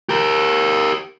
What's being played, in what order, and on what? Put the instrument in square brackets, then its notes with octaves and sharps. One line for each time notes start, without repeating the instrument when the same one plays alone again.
[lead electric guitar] G4 A#4